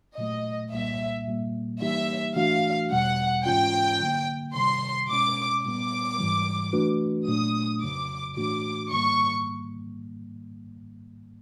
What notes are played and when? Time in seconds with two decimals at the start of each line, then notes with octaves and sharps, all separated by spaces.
0.18 A#2 F#3 A3 D#5
0.72 C2 A#2 G3 A#3 E5
1.27 A#2 G3 A#3
1.81 E3 G3 A#3 D#4 G4 E5
2.36 E3 A3 D4 F#4 F5
2.91 E2 B2 G3 F#5
3.45 G#2 E3 G#3 C#4 F4 G5
4.00 D3 F#3 A#3
4.55 C3 D#3 G3 C6
5.09 B2 G#3 C#4 D6
5.63 A#2 G3 B3 D6
6.18 G#2 E3 G3
6.73 E3 A3 D4 F#4 B4
7.28 A#2 F#3 A3 D4 D#6
7.82 F2 C#3 F#3 D6
8.37 A2 E3 A3 D4 F#4 D6
8.91 G#2 D#3 G3 A#3 C#6